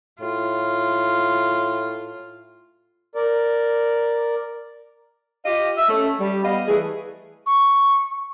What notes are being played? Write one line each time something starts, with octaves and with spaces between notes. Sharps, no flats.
A2 F4
A#4 D5
F4 G4 D#5 F5
E5
A3 C#4
G3
G3 B3 D#5 F5
E3 A3 G#4
C#6